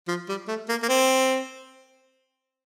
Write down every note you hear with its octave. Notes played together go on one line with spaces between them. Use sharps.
F3
G3
A3
A#3
A#3
C4